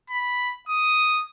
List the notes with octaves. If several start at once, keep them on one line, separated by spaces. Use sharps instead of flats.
B5
D#6